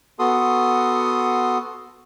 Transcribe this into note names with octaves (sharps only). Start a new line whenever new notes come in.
B3 F#4 A4 C6 D#6